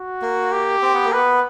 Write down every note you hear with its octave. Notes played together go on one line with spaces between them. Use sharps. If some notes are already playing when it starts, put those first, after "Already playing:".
Already playing: F#4
A#3
G4
C4
B3
A#3
B3 B4